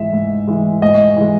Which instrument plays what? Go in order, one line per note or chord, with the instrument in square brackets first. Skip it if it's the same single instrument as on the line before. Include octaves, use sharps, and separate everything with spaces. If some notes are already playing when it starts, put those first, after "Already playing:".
Already playing: [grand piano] G#2 E3 G#3 [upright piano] E5
[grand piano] G#2
E3 G#3
[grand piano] G#2 [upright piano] D#5
[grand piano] E3 G#3